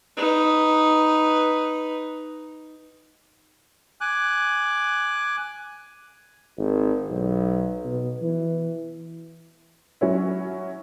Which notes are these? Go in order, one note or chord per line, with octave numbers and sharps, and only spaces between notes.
D#4 B4
G#5 D6 F#6
G#1
B1
B2
E3
F#3 C#4 E4